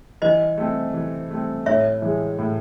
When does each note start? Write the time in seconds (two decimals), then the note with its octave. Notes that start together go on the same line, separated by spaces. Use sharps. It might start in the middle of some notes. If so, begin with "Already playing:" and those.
0.22 E3 C5 D#5
0.58 A3 C4
0.94 E3
1.31 A3 C4
1.66 A2 C#5 E5
2.02 E3 G#3
2.39 A2